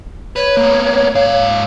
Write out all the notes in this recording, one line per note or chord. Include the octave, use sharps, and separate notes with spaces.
B4 C#5
A#3 B3
G#2 F5